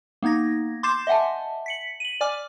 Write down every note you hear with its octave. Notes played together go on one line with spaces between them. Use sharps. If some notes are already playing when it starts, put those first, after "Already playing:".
A#3 B3 D#4 G#6 A#6
C6 D6 G6 A6 C7 E7
D#5 E5 F#5 G#5 A5
B6 C#7 F#7
D#7 F#7
D5 G#5 D6 F6